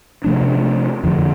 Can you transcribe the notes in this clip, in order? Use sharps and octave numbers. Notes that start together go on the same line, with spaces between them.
C3 F3 A3 D4
F2 D3 F3